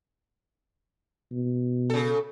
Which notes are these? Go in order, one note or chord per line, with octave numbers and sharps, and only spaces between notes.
B2
C#3 A4